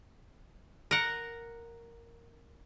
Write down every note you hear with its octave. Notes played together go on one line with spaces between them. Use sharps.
A#4 F#5